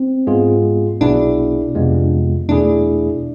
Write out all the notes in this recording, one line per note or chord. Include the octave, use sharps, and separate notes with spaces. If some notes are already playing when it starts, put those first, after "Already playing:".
Already playing: C4
G#2 G#3 B3 F4 G#4
B1 B2 B3 D4 E4 G#4
F2 C3 G#3 B3 F4
E2 B2 A3 D4 E4 G#4